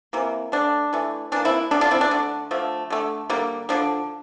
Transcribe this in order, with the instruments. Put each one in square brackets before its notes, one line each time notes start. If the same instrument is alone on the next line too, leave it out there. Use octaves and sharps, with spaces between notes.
[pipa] C3 E3 A#3
D3 A3 D4
E3 A3
E3 A#3 D4
C4 E4
D3 D4 F4
A3
D4 F4
C4 E4
D4
D3 A3
D3 F3 A3
D3 A3
D3 G3 A#3
D3 F3 A#3 D4